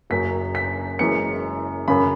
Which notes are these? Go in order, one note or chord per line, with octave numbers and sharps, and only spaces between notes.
F#1 F#2 F#3 B6
B6
F#1 F#2 E3 G#3 C#7
F#2 C#3 B5